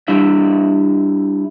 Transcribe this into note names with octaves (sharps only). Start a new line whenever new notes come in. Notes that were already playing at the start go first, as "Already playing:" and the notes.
G3 D4 E4 E5